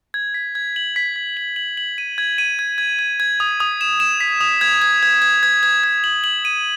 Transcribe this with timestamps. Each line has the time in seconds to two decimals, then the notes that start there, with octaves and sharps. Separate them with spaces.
0.14 G#6
0.34 B6
0.55 G#6
0.76 F#7
0.96 B6
1.16 B6
1.37 F#7
1.56 F#7
1.77 F#7
1.98 D#7
2.18 G#6
2.38 D#7
2.59 G#6
2.78 G#6
2.99 G#6
3.20 G#6
3.40 D#6
3.60 D#6
3.81 E7
4.00 E7
4.20 B6
4.41 D#6
4.61 G#6
4.82 G#6
5.03 G#6
5.22 G#6
5.43 G#6
5.63 G#6
5.84 G#6
6.04 F#7
6.24 F#7
6.45 D#7